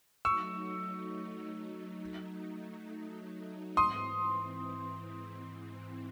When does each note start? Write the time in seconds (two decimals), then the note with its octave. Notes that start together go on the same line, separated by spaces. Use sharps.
0.25 F#3 A3 D#4 C#6 E6
3.77 G#2 E3 C4 C6 D#6